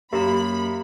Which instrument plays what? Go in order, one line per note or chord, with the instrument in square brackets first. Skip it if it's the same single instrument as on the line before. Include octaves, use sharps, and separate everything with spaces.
[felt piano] F#2 [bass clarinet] A#3 [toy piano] G4 A#5 [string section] B5